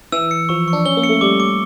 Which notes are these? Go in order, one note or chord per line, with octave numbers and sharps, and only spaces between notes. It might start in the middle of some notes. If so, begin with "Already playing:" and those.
E3 E6
C#7
F3 C#6
C#6
D4
C#4 G7
A#3
C#7
A3
G3 D6
D6